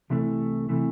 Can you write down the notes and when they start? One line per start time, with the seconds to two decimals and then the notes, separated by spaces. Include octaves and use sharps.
0.10 C2 C3 E3 A3
0.69 C3 E3 A3